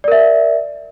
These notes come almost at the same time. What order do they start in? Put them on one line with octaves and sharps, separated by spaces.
D5 A#4 E5